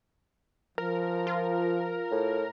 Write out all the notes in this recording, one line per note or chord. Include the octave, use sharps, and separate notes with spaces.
F3 A#4
F4
A2